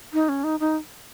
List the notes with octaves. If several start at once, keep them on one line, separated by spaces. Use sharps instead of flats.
D#4
C#4
D#4
D#4